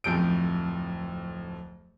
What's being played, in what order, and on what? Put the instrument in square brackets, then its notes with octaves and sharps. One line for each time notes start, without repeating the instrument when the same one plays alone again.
[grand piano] D1 F2 F3 G6 D7